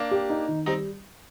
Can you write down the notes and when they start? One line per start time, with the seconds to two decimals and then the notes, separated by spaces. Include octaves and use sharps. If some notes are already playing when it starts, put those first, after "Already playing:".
Already playing: A#3 D4
0.11 G4
0.30 D#4
0.48 D#3
0.66 G3 C4 D#4